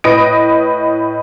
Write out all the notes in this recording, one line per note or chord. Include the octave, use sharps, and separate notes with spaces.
A2 B4 D#5 D#6 A#6 D7